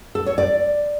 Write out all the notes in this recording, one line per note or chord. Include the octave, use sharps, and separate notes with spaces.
A4
C#5
D5